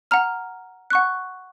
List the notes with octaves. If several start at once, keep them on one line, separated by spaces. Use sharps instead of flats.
F#5 A#5 F6
F#5 C#6 F#6